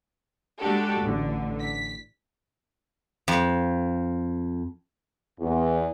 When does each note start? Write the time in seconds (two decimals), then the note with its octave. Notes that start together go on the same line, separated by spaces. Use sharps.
0.60 G#3 D4 F#4 G4 A4
1.02 A1 D3
1.60 B6
3.28 F2
5.40 E2